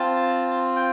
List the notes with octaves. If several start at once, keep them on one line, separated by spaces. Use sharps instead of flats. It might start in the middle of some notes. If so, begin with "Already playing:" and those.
Already playing: C4 F4 A5
G5